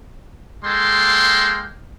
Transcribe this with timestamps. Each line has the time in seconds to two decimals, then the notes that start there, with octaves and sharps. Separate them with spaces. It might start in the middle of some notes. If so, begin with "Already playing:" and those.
0.64 G#3 A#3 A4 G5 C6